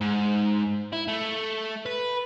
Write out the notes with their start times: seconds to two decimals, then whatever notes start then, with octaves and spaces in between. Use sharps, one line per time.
0.01 G#2
0.93 E4
1.08 A3
1.86 B4